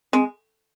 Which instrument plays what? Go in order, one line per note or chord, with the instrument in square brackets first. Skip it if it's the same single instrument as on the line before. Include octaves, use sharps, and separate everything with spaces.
[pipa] G#3 [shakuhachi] C4